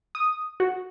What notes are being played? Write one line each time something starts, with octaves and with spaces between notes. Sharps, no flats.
D#6
F#4